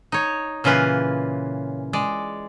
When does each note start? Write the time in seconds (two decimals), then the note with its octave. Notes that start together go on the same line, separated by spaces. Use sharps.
0.12 D#4 C#5
0.64 A#2 C#3 E3 F4 B4
1.93 G#3 D5